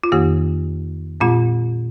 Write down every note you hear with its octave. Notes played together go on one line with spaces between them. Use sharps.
F4
F2 D#3 A#3 G4
A#2 G#3 C4 F4